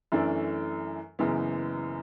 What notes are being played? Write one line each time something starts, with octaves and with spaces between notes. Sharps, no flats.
F#2 E3 A3 D4 A4
F#1 F#2 E3 B3